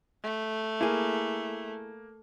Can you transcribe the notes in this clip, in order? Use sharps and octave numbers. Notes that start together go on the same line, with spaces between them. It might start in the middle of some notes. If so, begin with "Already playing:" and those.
A3
A#3 E4 G#4